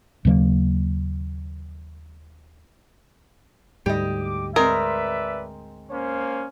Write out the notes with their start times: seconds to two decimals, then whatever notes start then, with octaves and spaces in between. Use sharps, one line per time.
0.25 D#2 C#3 F#3 A#3
3.86 D2 G#2 G3 G4 D#5
4.20 D6
4.56 G#3 C4 A#4 B4 D5 E5
5.90 A#3 C#4 C5